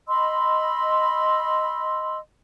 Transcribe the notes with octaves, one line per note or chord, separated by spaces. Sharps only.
D#5 B5 C6 E6